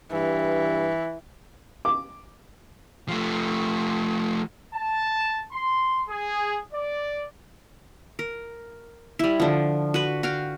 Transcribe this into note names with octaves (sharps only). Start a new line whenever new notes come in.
G2 E3
D6
F3 A3
A5
C6
G#4
D5
A#4
G3 E4
D3 F3
F#4 B4
F#4 F5 G5